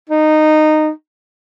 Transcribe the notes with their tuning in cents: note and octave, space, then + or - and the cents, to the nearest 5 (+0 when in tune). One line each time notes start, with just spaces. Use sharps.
D#4 -15